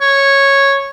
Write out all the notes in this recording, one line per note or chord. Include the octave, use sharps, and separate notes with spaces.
C#5